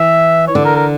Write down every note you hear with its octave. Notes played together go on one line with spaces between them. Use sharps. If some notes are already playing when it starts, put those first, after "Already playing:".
Already playing: E3 E5
C#5
D3 D5
A#4
A#4